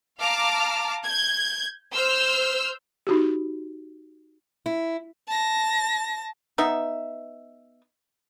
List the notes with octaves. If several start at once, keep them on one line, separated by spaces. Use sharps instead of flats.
F5 A5 A#5 D6 F6
G6 G#6
C5 E6 F6 G6
D#4 F#4 G4
E4
A5 A#6
B3 D#4 E5